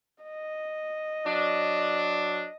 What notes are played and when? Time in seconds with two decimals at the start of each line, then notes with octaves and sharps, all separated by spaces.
0.24 D#5
1.26 F#3 D4